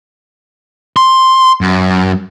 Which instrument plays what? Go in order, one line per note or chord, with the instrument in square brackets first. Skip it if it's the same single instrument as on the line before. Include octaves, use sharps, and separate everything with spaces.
[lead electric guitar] C6
F#2